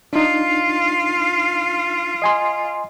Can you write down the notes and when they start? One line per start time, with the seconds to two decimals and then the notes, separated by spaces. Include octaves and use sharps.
0.13 D4 D#4 F4 F5
2.22 D#5 G#5 C6